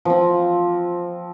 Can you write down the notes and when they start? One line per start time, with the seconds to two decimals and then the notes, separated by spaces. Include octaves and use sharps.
0.05 F3 C4